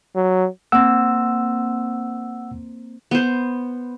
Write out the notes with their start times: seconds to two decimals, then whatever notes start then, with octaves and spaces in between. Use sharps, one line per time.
0.16 F#3
0.72 A#3 C4 F#5 E6
3.11 B3 C5